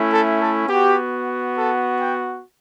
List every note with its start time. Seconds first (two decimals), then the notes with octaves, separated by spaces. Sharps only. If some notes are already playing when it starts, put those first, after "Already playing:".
Already playing: A3 C#4 E4
0.10 A4
0.40 A4
0.68 B3 F#4 G4
1.56 A4
1.99 G5